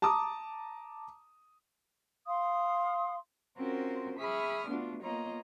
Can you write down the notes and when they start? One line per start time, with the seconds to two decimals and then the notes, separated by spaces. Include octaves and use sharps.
0.02 A5 A#5 D6 D#6
2.27 F5 C6 D#6
3.57 C4 C#4 F4 F#4 A#4 C5
4.18 G#4 E5 B5 C#6 D#6 F6
4.68 A3 B3 D4 F4 F#4
5.02 A#3 B3 F4 C#5 D#5 A#5